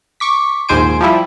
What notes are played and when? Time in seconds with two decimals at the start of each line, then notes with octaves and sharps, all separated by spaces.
0.20 C#6 D6 B6
0.69 A#1 D#2 G#2 C5 G#5 D7
1.01 F3 G3 E4